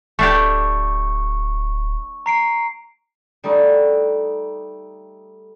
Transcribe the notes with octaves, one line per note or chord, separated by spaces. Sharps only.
D1 A3 D4 G4 C#6
A#5 C7 D7
G3 A3 D#4